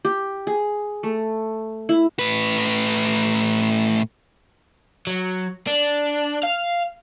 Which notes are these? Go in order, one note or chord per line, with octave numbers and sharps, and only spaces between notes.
G4
G#4
A3
E4
A2 B4
F#3
D4
F5